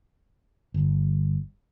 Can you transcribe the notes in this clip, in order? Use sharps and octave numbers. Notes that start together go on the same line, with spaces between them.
G1